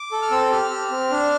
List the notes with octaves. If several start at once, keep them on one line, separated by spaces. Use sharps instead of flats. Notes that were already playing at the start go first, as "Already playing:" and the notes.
Already playing: D6
A4
F6
C4 E6
G4 F6
G4
C4
D4